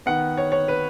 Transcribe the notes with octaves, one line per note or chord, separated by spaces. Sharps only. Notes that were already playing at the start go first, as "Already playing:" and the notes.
D#3 B3 F#5
C#5
C#5
B4